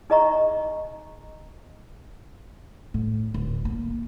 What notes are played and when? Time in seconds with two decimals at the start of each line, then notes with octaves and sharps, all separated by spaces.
0.10 D#4 G#4 D#5 E5 A#5 C#6
2.94 A2
3.34 D1
3.65 A#3